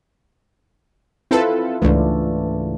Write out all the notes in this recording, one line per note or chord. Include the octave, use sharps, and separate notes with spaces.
C4 E4 F4 A4 B4
C#2 G#2 E3 A3 D4